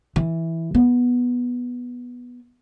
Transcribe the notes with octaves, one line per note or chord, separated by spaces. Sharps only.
E3
B3